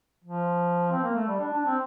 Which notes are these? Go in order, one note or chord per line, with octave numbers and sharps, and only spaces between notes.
F3
C4
A#3
A3
G3
D4
D4
C4